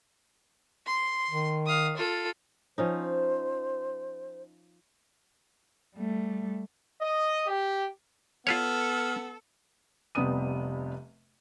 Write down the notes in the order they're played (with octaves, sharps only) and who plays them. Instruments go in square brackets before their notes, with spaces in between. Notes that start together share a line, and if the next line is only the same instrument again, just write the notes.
[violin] C6
[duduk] D#3
[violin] F5 D#6
F4 A4
[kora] F3 C#4 D#4 [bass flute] C5
[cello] G3 A3
[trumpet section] D#5
G4
[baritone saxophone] B3 [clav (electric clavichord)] F4 B4 C#5 [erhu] A4 [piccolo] F6
[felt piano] F1 C3 G3 B3 D#6 D#7